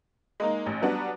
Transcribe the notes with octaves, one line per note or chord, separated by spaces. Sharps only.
G#3 A#3 D#4
A1
F#3 G3 B3 D4 F#4